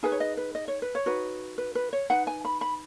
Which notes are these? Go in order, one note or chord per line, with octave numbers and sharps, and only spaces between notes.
D#4 G#4 B4 G#5
C#5
D#5
B4
D#5
C#5
B4
C#5
D#4 F#4 B4
B4
B4
C#5
D#4 B4 F#5
G#5
B5
B5